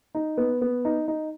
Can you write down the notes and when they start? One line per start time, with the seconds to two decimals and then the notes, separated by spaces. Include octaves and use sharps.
0.15 D#4
0.37 B3
0.61 B3
0.85 D#4
1.08 D#4